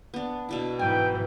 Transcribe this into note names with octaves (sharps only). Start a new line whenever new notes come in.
B3 D4
B2 D4 E4
G#2 E3 G5 G#5